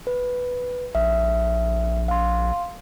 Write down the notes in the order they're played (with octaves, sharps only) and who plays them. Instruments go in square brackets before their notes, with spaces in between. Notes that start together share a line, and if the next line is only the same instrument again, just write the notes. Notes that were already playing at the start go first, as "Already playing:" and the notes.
[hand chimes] B4
[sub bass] A#1 [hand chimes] E5
[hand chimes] F5 C6